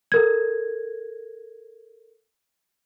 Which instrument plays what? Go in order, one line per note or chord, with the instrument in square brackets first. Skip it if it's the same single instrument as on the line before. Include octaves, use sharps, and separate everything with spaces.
[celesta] A4 A#4 G#6